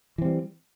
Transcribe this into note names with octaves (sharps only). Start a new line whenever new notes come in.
E3 G3 C4